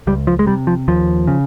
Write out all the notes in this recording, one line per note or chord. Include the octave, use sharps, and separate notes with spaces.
C#2 G3
F3
G#3
C3 G3
F3
D#2 F3
C#3